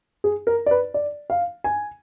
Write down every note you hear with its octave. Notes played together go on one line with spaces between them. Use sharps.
G#4
A#4
D5
B4
D5
F5
G#5